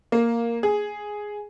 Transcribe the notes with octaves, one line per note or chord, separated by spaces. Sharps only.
A#3
G#4